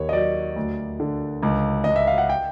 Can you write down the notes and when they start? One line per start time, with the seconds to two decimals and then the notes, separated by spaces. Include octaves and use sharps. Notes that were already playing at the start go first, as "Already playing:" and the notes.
Already playing: D#2 C#5
0.09 D#5
0.13 F#3 D5
0.56 D2
1.00 D3
1.43 C#2
1.84 C#2 D#5
1.96 E5
2.07 F5
2.18 F#5
2.29 G5